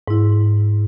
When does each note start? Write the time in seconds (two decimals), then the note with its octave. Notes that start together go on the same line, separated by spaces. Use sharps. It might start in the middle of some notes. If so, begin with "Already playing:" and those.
0.08 G#2 E4